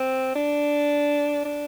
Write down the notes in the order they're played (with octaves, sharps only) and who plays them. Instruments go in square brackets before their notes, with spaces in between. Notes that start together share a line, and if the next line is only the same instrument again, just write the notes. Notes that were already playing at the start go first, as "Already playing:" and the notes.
Already playing: [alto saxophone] C4
D4
D4